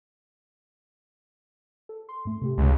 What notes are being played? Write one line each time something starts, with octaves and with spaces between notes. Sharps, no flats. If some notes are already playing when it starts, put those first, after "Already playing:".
A4
C6
G#2 A3
C3 A3 G4
C#2